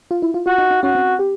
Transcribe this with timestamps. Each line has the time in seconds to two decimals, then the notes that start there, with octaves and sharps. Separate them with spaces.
0.11 F4
0.22 E4
0.34 F4
0.46 F4 F#4
0.58 D#4
0.71 D#4
0.83 C#4 F#4
0.95 C4
1.19 G4